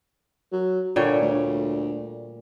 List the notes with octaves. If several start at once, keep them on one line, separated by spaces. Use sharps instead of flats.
F#3
A#2 D3 G3 C#5
D2